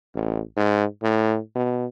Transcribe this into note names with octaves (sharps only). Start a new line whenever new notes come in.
A1
G#2
A2
B2